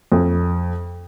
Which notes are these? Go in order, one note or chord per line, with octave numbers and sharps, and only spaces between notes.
F2